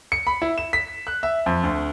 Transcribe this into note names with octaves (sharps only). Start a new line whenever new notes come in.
C#7
B5
E4
E7
B6
F#6
E5
F2
D2